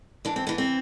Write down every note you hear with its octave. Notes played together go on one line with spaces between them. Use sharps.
E3 D4
C4
E3 B3
C4